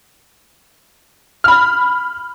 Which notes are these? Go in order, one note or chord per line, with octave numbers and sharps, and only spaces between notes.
B5 F6